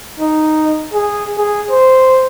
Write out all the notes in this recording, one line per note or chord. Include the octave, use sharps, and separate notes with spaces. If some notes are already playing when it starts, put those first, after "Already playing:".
D#4
G#4
G#4
C5